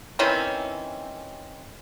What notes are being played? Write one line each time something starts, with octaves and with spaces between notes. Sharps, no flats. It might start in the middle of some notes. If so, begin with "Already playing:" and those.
D#3 E3 C4 C#4